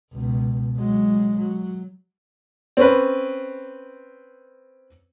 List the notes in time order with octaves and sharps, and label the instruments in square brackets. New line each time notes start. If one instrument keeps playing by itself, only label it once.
[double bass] C#2 B2
F#3 G#3
F#3
[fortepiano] C4 C#4 B4